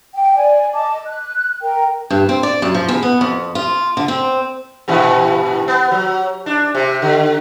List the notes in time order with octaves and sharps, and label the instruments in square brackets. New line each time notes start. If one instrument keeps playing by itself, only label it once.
[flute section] G5
D5 G#5
D#5 A5 D6
F#6
A#4 G5
[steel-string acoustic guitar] G2
C4
D5
F#2
F3
E2
B3
F2
F4
D3
C4
[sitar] G2 A#2 E3
B3
F#3
D4
C3
D3